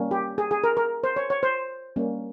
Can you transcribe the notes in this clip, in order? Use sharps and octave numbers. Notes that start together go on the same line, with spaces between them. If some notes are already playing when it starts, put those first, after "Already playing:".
Already playing: G3 A#3 C#4
G4
G#4
G#4
A#4
A#4
C5
C#5
C#5
C5
G3 A#3 C#4